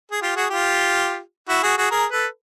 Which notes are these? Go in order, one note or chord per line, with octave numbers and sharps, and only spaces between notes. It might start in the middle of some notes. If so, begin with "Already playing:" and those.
G#4
F4 G4
F#4 G#4
F4 G4
E4 F#4
F#4 G#4
F#4 G#4
G#4 A#4
A4 B4